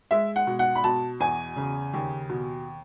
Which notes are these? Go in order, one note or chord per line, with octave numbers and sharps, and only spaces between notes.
G#3 E5
F#5
B2
F#5
B5
B2 A5
E2 G#5
C#3
D#2
B2